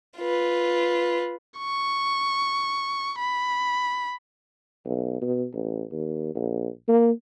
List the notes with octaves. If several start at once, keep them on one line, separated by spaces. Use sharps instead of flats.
F4 B4
C#6
B5
B1
B2
A1
D#2
A#1
A#3